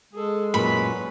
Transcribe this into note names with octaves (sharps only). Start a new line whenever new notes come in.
G#3 G#4 A4
F#2 A#2 B4 C#5 B5